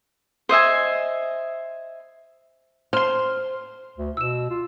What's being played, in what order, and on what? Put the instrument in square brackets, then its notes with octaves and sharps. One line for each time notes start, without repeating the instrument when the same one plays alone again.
[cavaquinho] C5 D#5 E5 G#5
[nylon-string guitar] C5 [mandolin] C6 F6
[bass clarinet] D2
[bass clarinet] B2 [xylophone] E6 E7
[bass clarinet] F4